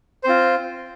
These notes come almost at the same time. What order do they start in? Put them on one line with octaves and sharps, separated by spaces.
C5 C4 F4